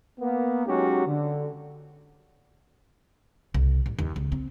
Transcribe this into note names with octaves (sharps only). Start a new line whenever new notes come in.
A#3 B3
F#3 G#3 C#4 D#4 F#4 G4
D3
C2
A1
D#2
C#2
C4